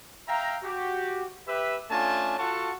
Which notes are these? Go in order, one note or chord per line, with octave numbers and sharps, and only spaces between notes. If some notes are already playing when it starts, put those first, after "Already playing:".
E5 F5 G5 A#5
F#4 G4
G4 B4 E5
A3 C#4 D4 F4 G#5 A5
F4 F#4 A4 F#5 A5 C#6